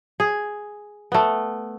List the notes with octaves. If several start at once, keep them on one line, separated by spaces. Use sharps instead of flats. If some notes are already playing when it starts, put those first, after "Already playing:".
G#4
A3 B3